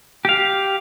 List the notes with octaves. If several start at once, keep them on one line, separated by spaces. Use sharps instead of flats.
G4 F5